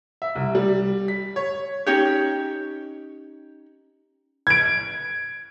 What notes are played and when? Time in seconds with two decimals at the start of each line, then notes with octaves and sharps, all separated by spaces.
0.22 E5
0.35 C2
0.55 G3
1.08 B6
1.36 C#5
1.86 C#4 D#4 G4 C#5
4.47 G#6 D7